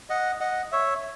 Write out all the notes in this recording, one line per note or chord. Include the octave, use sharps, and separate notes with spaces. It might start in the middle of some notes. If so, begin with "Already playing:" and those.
D#5 F#5
D#5 F#5
C#5 E5